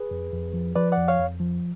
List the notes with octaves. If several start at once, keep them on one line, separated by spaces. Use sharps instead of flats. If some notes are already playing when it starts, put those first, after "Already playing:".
Already playing: G#4 B4
F2
F2
F3
F3 B4 D5
F2 D5 F#5
C#5 F5
F2
F3